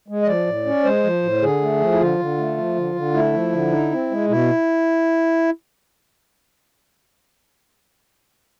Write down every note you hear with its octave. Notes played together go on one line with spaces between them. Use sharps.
G#3
D#5
F3 D5
A2
C#4
G#3 C5
F3
A2
D3 G#4
A3
F3
E4
D3 F4
D3
A3
F3
D3
D3
A3 E4
F3
D3
D#4
C4
G#3
B2 E4